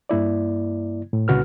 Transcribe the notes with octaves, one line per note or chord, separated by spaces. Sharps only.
G2 A#3 E4 D5
A2
C2 A#2 C#3 F#4 B4 F6